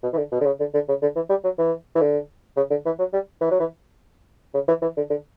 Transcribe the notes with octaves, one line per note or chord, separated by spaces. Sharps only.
B2
E3
D3
B2
D3
C#3
D3
D3
C#3
D3
E3
G3
F#3
E3
E3
D3
C#3
D3
E3
F#3
G3
E3
F#3
E3
C#3
E3
E3
D3
D3